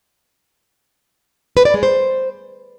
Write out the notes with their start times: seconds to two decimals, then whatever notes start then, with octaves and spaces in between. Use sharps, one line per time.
1.57 B4
1.65 D5
1.74 G#3
1.83 C5